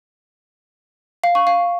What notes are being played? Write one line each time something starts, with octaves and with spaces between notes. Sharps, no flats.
F5
C#6
F5